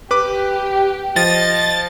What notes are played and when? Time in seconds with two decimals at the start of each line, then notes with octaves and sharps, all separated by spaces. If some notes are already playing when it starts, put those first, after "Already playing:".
0.11 G4 B4 D6
1.16 F3 D#5 A6